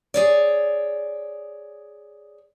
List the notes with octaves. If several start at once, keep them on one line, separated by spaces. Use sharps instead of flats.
G#4 C#5 D5